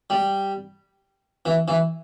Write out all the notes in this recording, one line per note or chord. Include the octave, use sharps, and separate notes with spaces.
G3
E3
E3